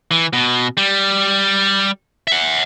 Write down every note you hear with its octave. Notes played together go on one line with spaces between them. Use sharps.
E3
B2
G3
E5 F#5